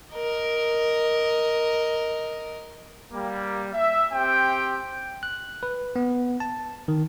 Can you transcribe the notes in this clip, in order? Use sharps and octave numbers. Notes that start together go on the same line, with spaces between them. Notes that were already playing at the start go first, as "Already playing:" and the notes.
A#4 D#5
G3 A#3
E5
C4 G4 G5
F#6
B4
B3
A5
D#3